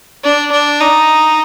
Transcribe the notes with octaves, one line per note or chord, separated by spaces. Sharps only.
D4
D4
D#4